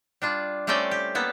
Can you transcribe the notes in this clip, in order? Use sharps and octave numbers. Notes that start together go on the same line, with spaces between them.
G3 D4 F4
G3 A3 C4 C#4 D5 G5
G4
A#3 B3 A4